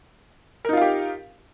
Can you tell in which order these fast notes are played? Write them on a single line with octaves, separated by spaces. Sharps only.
A#4 D#4 F4 F5 G4